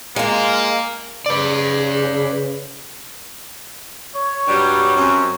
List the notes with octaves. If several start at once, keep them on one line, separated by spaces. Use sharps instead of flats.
G#3 A#3 F4
C#3 B4 D5
C#5
G2 F#3 G3
F#2 C4